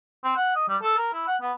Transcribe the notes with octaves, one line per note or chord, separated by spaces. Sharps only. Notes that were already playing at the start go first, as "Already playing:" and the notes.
C4
F#5
D#5
G3
A4
A#4
E4
F#5
B3